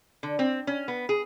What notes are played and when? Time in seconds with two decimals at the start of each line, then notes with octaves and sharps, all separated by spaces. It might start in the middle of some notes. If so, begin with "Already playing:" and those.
0.23 D3
0.39 C4
0.67 C#4
0.88 B3
1.09 G#4